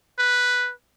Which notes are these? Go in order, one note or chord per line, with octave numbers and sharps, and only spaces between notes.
B4